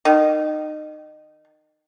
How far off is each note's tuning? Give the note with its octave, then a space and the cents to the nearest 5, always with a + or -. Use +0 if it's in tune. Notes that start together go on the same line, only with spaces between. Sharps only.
D#3 -25